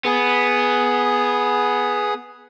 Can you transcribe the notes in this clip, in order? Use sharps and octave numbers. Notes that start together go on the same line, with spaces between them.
B3 G#4